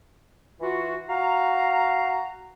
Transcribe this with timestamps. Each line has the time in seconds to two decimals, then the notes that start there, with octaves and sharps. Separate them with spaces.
0.61 E3 F4 F#4
1.09 F#4 F5 A#5